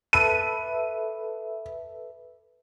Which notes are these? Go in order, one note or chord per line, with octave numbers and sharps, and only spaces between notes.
A4 B4 E5 D#7